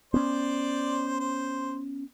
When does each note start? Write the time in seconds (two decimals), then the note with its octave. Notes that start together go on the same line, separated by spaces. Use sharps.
0.14 B3 C#4 C5 D5
1.20 C5